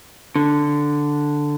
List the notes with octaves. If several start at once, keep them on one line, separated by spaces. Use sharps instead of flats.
D3